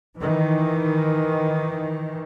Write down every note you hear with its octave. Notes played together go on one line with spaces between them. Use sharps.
D#3 E3